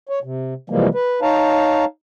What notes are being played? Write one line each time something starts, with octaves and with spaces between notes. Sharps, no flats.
C#5
C3
C3 E3 F3 G3 G#3 A#3
B4
D#4 C#5 F5 A5 A#5